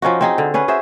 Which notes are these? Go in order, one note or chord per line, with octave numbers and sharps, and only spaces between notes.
F3 C#4 D#4 F#4
C4 D#4 G#4
D3
C#4 G#4 B4
F#4 G#4 C5 E5